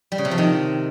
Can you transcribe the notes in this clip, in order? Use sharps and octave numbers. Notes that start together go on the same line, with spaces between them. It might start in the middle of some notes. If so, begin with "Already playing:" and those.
G3
C#3
C3
F3
D#3